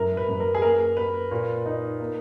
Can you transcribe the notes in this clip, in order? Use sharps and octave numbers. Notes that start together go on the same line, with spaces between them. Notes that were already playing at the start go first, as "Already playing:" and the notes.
Already playing: F#2 E4 A#4
B4
F#2
A#4
G#4
A#3 A#4
A#3 B4
A#2
D#4
A#3